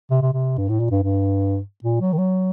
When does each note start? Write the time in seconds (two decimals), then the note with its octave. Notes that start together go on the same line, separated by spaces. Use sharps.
0.10 C3
0.22 C3
0.33 C3
0.58 G2
0.69 A2
0.80 A#2
0.91 G2
1.03 G2
1.84 A#2
2.01 F#3
2.13 D#3
2.18 F#3